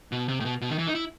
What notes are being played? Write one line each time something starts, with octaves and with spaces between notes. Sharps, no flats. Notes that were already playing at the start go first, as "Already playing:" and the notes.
B2
C3
A2
B2
B2
D#3
E3
D#4
E4